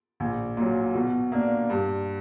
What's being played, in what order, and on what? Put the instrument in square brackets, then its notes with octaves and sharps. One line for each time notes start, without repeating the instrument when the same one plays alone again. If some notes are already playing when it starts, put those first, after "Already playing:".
[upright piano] A#1
A#2 F#3
B2
A#3 D4
G2